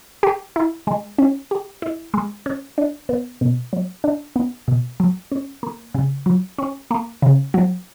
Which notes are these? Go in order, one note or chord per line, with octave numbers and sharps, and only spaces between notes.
G4
E4
G#3
C#4
G4
E4
G#3
C#4
D4
B3
B2
F#3
D4
B3
B2
F#3
C#4
A#3
C#3
F#3
C#4
A#3
C#3
F#3